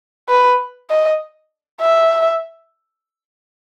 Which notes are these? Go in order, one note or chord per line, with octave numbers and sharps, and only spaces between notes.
B4
D#5
E5